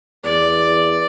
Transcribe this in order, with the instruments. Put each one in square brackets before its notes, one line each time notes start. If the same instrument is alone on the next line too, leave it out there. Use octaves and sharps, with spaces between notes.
[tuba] E2 [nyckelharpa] D5